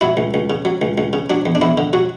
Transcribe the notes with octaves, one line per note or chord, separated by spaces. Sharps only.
F#3 E4
C#2
C#2
C#3
F#3
C#2
C#2
C#3
F#3 D4
E2
D4
E2 E4
D3
F#3 F#4